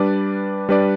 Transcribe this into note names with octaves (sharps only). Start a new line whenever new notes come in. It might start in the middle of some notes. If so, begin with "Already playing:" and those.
Already playing: G3 D4 B4 D5
G3 D4 B4 D5